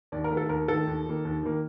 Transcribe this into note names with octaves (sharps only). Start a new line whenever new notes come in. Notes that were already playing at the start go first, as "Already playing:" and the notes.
D#2 D5
A#4
D#3 A3
A4
D#2 A#4
D#3 A3 A4
D#2
D#3 A#3
D#2
D#3 A#3